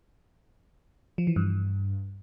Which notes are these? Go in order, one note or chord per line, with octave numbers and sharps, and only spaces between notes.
F3
E3
G2